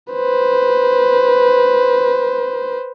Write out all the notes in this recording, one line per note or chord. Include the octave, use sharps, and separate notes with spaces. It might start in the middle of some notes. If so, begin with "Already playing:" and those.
B4 C5